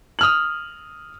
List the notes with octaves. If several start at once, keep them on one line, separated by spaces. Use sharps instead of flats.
D#6 F6 F#7